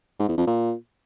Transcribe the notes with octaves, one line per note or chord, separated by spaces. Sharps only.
G#2
E2
F2
A#2